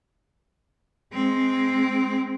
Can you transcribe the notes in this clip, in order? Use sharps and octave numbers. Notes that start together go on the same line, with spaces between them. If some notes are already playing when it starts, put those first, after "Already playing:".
G#3 C4